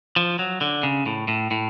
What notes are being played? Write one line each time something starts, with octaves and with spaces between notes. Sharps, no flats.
F3
F#3
D3
C#3
A2
A2
A2